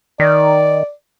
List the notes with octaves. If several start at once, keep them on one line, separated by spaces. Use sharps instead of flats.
D#3 D5